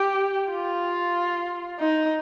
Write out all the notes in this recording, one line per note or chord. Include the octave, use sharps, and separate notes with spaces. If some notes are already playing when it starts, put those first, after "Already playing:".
Already playing: G4
F4
D#4